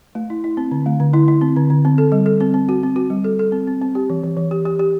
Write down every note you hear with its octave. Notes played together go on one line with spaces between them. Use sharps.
A3
E4
E4
C4
D3
A3
D3
E4
E4
C4
D3
D3
C4
A4
G3
A4
C4
C4
F#4
C4
F#4
G3
A4
A4
C4
C4
C4
G4
E3
E3
E3
G4
G4
G4